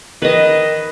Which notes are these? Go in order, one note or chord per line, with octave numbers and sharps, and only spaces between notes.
D#3 B4 D#5